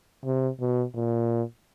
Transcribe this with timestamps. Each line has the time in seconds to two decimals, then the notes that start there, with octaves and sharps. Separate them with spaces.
0.25 C3
0.60 B2
0.94 A#2